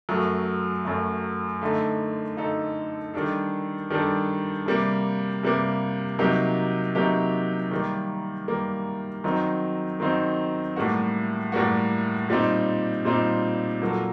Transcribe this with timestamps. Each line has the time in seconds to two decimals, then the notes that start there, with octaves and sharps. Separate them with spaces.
0.09 F#2 F#3 A3
0.85 F#2 F#3 A3
1.61 D3 A3 D#4 A4
2.37 D3 A3 D#4 A4
3.14 D#3 G3 D4 A4
3.90 D#3 G3 D4 A4
4.66 C3 G3 A#3
5.43 C3 G3 A#3
6.19 C3 F#3 A#3 D#4 G4
6.95 C3 F#3 A#3 D#4 G4
7.71 D#3 G3 A#3
8.48 D#3 G3 A#3
9.24 D#3 F#3 C4 D#4
10.00 D#3 F#3 C4 D#4
10.76 A2 G3 A#3 F#4
11.52 A2 G3 A#3 F#4
12.29 A#2 G3 C4 D#4
13.05 A#2 G3 C4 D#4
13.81 A#2 F#3 A#3 F#4 A4